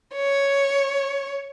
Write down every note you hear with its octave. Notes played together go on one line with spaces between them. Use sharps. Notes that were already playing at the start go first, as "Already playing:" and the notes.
C#5